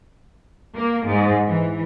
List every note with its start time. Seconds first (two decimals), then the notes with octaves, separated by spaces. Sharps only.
0.77 A#3
1.07 G#2
1.47 E3